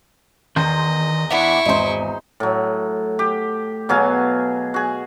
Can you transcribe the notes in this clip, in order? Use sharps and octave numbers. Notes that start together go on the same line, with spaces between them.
E2 D#3 D#5 C6 G6
E3 B3 D4 E4 E5 C#6
G#1 E2 D#4 C5
A2 F#3
G4
B2 F#3 G#4 F5
F#4 G#4